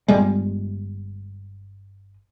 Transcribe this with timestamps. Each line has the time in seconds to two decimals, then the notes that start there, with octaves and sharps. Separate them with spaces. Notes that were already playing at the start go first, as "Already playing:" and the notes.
0.08 G1 G3 G#3